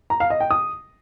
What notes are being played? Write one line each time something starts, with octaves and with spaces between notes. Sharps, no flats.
A#5
F5
D#5
G5
D#6